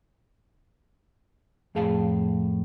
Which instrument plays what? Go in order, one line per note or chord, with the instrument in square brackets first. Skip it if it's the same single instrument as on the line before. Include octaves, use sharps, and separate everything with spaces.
[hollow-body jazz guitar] F2 A2 G#4 F5 A5